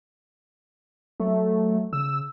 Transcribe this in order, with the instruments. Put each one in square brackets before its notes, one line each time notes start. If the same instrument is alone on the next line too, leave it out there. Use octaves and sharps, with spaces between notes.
[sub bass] F#3 [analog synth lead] A3
[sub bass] C#3 [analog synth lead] E6